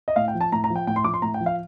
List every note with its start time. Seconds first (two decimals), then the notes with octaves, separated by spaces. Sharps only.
0.08 D#5
0.16 A2 F5
0.28 G5
0.34 F3
0.41 A5
0.52 A2 A#5
0.64 A#5
0.70 F3
0.76 G5
0.87 A2 G5
0.96 C6
1.04 F3 D6
1.14 C6
1.22 A2 A#5
1.34 G5
1.40 F3
1.46 F5